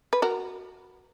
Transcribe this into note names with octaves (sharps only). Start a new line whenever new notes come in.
B4
F#4 A#4